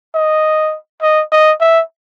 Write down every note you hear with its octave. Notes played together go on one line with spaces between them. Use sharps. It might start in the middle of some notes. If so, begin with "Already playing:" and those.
D#5
D#5
D#5
E5